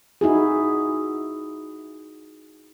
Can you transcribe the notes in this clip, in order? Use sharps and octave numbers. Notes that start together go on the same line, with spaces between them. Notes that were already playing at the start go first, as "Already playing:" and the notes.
D#4 E4 F#4 G#4